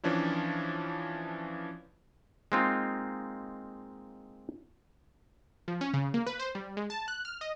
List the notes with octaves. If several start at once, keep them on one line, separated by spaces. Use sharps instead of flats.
E3 F3 C#4 D4 E4
G#3 A#3 C4 D#4 F4
F3
C#4
C#3
A#3
B4
C5
G3
G#3
A5
F#6
F6
D#5